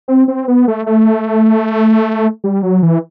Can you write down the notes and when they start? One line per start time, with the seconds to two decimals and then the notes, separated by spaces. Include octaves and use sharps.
0.08 C4
0.28 C4
0.48 B3
0.68 A3
0.86 A3
2.44 G3
2.63 F#3
2.83 E3